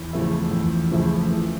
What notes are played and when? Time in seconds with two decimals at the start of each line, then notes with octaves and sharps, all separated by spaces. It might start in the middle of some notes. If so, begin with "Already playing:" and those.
Already playing: E2
0.13 C#3 F3 A3 E4
0.51 E2
0.90 C#3 F3 A3 E4
1.30 E3